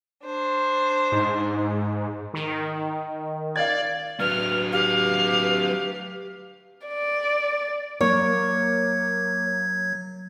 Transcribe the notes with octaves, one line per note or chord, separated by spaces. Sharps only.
D4 C5
G#2
D#3
D5 F5 G#6
F#3 D4 B4 F6
G4 B4 F5
D5
F#3 A#3 C#5 G#6